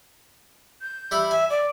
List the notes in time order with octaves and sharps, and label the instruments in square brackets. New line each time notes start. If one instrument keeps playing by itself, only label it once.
[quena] G6
[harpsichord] G3 E4 B5
[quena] E5 [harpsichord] G#5
[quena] D5